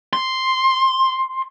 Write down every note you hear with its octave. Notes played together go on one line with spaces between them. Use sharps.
C6